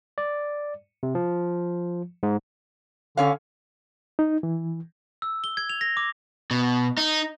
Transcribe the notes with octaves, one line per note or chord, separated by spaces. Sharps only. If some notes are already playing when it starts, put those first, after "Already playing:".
D5
C3
F3
G#2
D3 C#4 C#5 F5
D#4
E3
E6
G7
G#6
F7
A#6
D6
B2
D#4